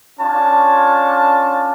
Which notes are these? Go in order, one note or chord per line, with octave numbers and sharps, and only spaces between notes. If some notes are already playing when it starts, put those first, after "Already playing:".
C#4 D4 F4 C#5 A5